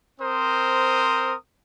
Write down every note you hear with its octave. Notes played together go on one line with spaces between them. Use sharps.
C4 A#4 C5 D#6